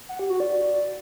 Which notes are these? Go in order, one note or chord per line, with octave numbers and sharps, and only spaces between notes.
F#5
G4
F#4
D5